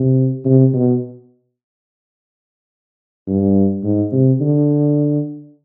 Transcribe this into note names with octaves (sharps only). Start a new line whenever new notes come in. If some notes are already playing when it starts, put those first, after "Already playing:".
Already playing: C3
C3
B2
G2
G#2
C3
D3